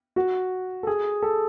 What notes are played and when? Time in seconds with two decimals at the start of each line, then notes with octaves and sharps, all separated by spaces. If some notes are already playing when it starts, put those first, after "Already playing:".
0.16 F#4
0.83 A4
0.87 G#4
1.23 A4